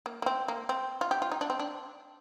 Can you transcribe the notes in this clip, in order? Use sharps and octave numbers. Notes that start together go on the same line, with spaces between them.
A#3
A#3
C4
A#3
C4
F4
G4
F4
D#4
D4
C4
D4